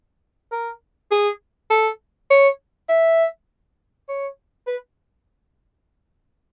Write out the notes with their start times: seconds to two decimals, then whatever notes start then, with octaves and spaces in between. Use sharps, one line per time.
0.52 A#4
1.11 G#4
1.70 A4
2.30 C#5
2.89 E5
4.09 C#5
4.67 B4